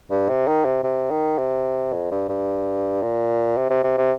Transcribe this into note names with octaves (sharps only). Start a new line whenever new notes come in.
G2
C3
D#3
C3
C3
D#3
C3
F2
G2
G2
A#2
C3
C3
C3
C3